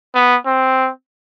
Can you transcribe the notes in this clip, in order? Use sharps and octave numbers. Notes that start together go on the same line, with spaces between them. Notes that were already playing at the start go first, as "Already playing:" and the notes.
B3
C4